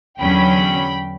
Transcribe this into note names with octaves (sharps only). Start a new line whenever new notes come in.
E2 D3 F#3 C#4 G5 B5